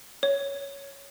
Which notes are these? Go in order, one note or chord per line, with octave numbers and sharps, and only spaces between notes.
C#5